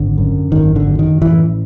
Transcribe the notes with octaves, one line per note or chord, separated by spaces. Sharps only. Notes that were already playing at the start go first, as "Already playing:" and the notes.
Already playing: G#1 D3
F#2
G#1 D#3
D3
F#2
D#3
A1 E3